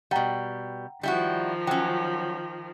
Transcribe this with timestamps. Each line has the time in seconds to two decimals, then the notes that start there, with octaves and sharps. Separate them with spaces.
0.11 B2 G3 F#5 G5 A#5
1.03 D#3 F3 G3 E4 F#4
1.67 F#3 C#4 G5